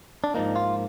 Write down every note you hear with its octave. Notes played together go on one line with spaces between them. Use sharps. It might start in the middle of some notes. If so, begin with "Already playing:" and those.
D4
G#2 F3 A#3 D#4
F4